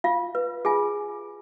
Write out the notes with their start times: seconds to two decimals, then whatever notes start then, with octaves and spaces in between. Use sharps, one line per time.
0.04 F4 F5
0.35 B4
0.65 F4 G#4 G#5